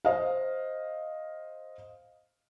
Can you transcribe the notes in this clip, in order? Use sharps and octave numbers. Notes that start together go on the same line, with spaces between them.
C5 D#5 F5